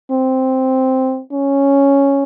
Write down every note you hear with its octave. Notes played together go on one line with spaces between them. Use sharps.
C4
C#4